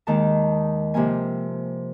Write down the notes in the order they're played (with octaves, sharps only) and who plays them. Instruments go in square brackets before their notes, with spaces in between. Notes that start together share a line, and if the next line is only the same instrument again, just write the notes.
[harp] D#2 D#3 G#3 A5
C3 F3 A#3 G#5